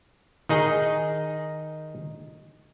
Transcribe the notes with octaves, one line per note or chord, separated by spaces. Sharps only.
D#3 D#4 G#4 D#5